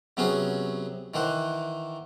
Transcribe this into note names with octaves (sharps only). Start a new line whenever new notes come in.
C3 F#3 B3 C#4 G#4
D#3 E3 C5 F#5